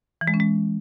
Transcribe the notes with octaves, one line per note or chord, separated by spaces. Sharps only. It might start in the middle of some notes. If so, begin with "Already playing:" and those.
E3
G#3
C#4
G#3